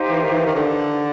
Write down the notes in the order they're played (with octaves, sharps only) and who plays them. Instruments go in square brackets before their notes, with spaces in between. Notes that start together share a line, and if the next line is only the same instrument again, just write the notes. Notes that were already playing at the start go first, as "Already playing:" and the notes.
Already playing: [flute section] D#4 G4 C5 F5
[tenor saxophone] E3
D#3
E3
D#3
D3